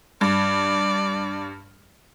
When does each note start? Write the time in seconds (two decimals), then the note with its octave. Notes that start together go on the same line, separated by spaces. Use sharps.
0.21 G2 D5